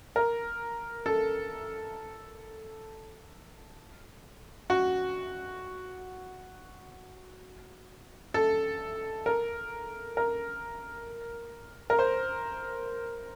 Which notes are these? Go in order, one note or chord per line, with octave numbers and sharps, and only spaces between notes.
A#4
A4
F#4
A4
A#4
A#4
A#4
C5